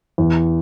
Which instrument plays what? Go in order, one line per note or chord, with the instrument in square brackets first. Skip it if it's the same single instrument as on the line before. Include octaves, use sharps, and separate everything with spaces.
[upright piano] E2